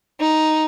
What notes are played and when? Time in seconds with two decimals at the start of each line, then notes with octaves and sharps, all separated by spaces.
0.20 D#4